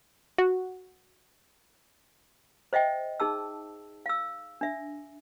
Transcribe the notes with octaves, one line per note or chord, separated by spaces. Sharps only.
F#4
C5 D#5 E5 G5
D#4 G#4 A5 E6
F5 E6
D4 E5